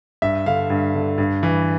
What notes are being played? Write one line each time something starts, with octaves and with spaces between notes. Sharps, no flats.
G2 E5
D3 F5
G2
D3
G2
E3